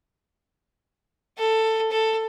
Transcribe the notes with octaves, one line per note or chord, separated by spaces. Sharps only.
A4
A4